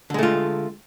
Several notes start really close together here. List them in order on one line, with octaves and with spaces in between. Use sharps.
D3 G#3 A3 F4